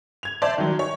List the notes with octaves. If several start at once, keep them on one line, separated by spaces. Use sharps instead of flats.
G#6 F7
C5 D5 E5 A5 C6
D#3 F#3
C#5